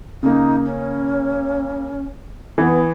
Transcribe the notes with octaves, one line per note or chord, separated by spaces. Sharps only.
C#3 A#3 D#4
C#4
E3 B3